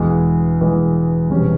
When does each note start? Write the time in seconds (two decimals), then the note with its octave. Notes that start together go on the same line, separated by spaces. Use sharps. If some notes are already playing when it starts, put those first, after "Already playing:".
Already playing: E1 E2 E3 G#3
0.61 E1 E2 E3 G#3
1.30 E1 E2 C3 G3 C#4